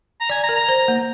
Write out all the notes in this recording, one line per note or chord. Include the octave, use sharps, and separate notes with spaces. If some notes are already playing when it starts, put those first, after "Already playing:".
A#5
D5 G#5
A#5
A#4
A#5
C5
A#3